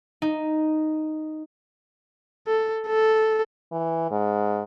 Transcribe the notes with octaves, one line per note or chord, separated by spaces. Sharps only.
D#4
A4
A4
E3
G#2